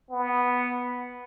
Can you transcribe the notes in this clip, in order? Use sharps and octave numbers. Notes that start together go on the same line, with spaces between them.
B3